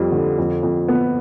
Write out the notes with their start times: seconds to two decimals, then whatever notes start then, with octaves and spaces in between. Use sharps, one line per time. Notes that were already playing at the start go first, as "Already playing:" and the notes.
Already playing: F2 G3
0.12 D3
0.38 F2
0.63 F2
0.88 B3